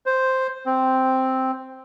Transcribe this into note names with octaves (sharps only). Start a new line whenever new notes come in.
C5
C4